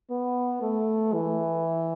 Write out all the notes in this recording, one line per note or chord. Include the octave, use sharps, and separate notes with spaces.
B3
A3
E3